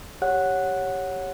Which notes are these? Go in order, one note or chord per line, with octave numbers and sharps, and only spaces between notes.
G4 C#5 F#5 F#6